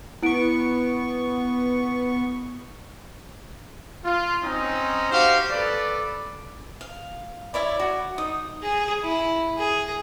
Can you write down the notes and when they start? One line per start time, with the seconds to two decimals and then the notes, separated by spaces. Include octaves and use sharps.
0.23 B3 E4 C#6 D7
4.04 F4
4.43 C4 C#4 D#4
5.10 F#4 G4 C5 F5
5.50 A4 B4 D5
6.81 F5
7.54 E4 C#5 D5 E5
7.80 F#4
8.18 D#4 D#6
8.63 G#4
9.04 E4
9.57 G#4